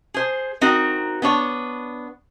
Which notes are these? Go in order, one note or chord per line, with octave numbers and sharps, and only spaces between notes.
G#4 C5
C4 D#4 F#4 A#4
B3 D4 C#5